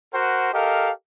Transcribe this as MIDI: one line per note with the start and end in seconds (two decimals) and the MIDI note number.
0.13 0.49 66
0.13 0.49 70
0.13 0.49 72
0.13 0.49 78
0.53 0.91 67
0.53 0.91 69
0.53 0.91 70
0.53 0.91 75
0.53 0.91 77